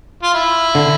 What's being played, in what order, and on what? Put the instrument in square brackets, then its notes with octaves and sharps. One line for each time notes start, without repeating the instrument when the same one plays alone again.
[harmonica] F4
E4
[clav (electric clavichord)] D3